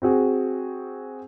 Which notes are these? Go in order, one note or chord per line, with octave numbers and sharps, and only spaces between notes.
C4 F#4 G#4